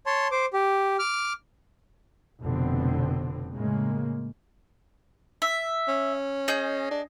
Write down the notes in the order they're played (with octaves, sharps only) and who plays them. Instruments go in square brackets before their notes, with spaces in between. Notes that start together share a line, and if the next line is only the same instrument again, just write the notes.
[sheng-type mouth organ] C#5 A5 C6
C5 D6
G4
D6 F6
[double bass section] F1 B2 D3 B3 C4
A2 C#3 G#3 A#3
[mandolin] E5
[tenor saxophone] C#4
[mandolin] G#4 D#5 G6
[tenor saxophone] D4